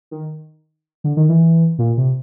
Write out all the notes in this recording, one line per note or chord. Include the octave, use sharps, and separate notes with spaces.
D#3
D3
D#3
E3
A#2
C3